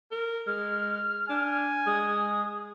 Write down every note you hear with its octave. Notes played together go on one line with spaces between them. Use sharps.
A#4
G#3 F6
D4 G#5
G#3 D#6